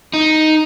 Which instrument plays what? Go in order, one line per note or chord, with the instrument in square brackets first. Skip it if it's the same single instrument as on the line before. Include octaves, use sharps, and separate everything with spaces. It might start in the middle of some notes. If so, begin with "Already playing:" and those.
[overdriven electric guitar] D#4